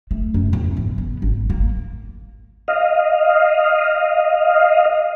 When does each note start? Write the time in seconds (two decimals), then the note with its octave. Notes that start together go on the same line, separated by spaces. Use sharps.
0.11 A3
0.34 F#2
0.53 E2
0.77 G#2
0.98 B3
1.22 G#1
1.50 A#3
2.68 D#5 F5